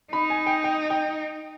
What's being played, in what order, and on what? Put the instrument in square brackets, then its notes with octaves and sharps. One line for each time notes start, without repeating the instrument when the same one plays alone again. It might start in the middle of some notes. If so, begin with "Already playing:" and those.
[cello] D#4 [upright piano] B5
[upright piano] G#5
G5
G5
G5